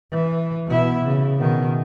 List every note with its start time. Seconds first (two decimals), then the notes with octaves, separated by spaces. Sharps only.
0.12 E3
0.66 B2 E4
1.05 C#3
1.38 B2 D#3